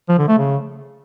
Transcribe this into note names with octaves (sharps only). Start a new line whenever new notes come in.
F3
D3
A3
C#3